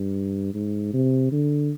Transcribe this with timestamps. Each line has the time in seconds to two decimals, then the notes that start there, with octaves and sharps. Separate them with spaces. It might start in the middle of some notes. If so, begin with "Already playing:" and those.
Already playing: G2
0.54 G#2
0.93 C3
1.32 D3